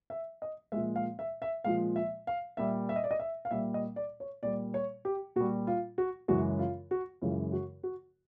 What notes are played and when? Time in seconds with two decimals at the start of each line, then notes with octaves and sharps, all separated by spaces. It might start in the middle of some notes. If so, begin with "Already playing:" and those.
0.10 E5
0.42 D#5
0.72 A#2 F3 G#3 E5
0.96 F5
1.19 E5
1.42 E5
1.64 A#2 F3 G#3 F5
1.96 E5
2.27 F5
2.57 A#2 G3 E5
2.89 E5
2.96 D#5
3.04 D5
3.11 D#5
3.19 E5
3.45 F5
3.51 A#2 G3 E5
3.74 D#5
3.96 D5
4.20 C#5
4.43 A#2 G3 D5
4.74 C#5
5.05 G4
5.36 A#2 G3 F#4
5.67 F4
5.98 F#4
6.28 F#2 C#3 E3 G#3 F#4
6.59 F4
6.91 F#4
7.22 F#2 C#3 E3 G#3 F4
7.53 F#4
7.83 F#4